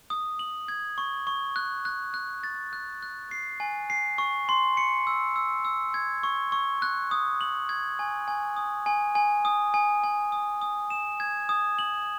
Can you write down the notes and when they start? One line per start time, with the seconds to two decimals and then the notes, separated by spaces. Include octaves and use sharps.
0.10 D#6
0.39 F#7
0.68 G#6
0.98 C#6
1.27 C#6
1.56 F#6
1.85 F#6
2.14 F#6
2.44 A6
2.73 F#6
3.03 F#6
3.31 C7
3.60 G#5
3.90 C7
4.18 C#6
4.49 C6
4.77 C#7
5.07 E6
5.36 E6
5.65 E6
5.94 G#6
6.23 C#6
6.52 C#6
6.82 F#6
7.11 D#6
7.41 F#7
7.69 G#6
7.99 G#5
8.28 G#5
8.56 D#6
8.86 G#5
9.15 G#5
9.45 D#6
9.74 G#5
10.04 G#5
10.32 D#6
10.61 D#6
10.90 E7
11.20 G#6
11.49 D#6
11.79 F#7